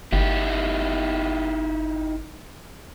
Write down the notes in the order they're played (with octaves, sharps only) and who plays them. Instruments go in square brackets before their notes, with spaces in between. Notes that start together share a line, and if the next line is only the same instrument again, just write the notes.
[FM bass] G1 [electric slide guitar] D#4 E4 G4